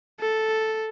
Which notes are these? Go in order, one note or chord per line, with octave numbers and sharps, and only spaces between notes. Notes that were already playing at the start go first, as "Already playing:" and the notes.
A4